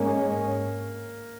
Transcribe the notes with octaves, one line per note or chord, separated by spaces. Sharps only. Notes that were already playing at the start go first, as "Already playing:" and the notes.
Already playing: G#2 G#3 A#3 C#4